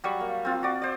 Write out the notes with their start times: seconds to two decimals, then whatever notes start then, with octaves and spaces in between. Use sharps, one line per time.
0.04 F#3 G3 F#5 C#6
0.20 A#3
0.45 C4 F4
0.63 F#4 D5
0.82 C5 D5